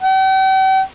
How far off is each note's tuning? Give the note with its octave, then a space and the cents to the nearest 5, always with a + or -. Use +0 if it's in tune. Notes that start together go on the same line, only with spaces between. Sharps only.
G5 -45